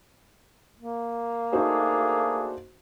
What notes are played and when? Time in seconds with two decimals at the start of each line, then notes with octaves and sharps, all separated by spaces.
0.79 A#3
1.53 A3 D4 D#4 F#4 G#4 C5